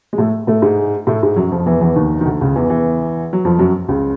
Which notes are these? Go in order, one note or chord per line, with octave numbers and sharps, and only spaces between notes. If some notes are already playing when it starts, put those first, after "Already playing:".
G#3
A2 A3
A2 A3
G#2 G#3
A2 A3
G#2 G#3
F#2 F#3
F2 F3
E2 E3
E2 E3
D#2 D#3
D#3
D2 D3
C#2 C#3
E2 E3
E2 E3
F#3
F2 F3
F#2 F#3
C#2 C#3